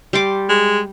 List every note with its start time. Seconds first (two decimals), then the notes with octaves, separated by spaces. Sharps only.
0.13 G3 C6 D6
0.49 G#3